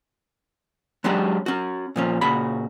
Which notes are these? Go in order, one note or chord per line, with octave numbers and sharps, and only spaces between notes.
F#3 G#3 C#4 D4 F#4 G4
C#4 F#4
A#2 F3 C#4
A#2 C#3 F#4 B5